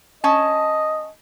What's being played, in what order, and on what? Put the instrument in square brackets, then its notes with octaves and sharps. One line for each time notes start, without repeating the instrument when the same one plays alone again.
[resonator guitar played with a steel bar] C#4 A5 [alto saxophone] D#5